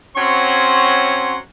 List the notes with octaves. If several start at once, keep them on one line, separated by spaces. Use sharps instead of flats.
F#3 C4 C#4 C#5 F#5 C6